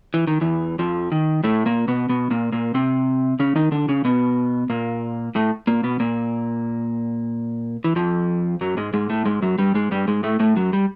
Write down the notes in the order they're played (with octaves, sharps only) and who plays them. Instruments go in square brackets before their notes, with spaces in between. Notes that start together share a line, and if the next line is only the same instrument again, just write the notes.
[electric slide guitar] E3
D#3
E2 E3
F2 F3
D#3
A2 A3
A#2 A#3
B2 B3
B2 B3
A#2 A#3
A#2 A#3
C3 C4
C#3 C#4
D#3 D#4
D3 D4
C#3 C#4
B2 B3
A#2 A#3
A2 A3
A#2 A#3
B2 B3
A#2 A#3
E3
F2 F3
F#2 F#3
G#2 G#3
G#2 G#3
A2 A3
G#2 G#3
F#2 F#3
G2 G3
G#2 G#3
G2 G3
G#2 G#3
A2 A3
A2 A3
F#2 F#3
G3